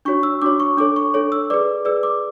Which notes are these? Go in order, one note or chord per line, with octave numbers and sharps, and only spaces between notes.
D4 F#4 C#5 C#6
E6
D4 F#4 C#5 D6
C#6
D4 A4 C#5 D6
C#6
D4 A4 C#5
E6
G#4 B4 D5 D6
G#4 B4 D5 E6
D6